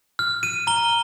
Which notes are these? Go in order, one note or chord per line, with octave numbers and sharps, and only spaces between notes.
F6
F6 D#7
A#5 G7